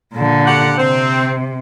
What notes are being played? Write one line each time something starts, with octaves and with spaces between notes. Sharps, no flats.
A#2 D3
G4 A4 F#5
C3 C4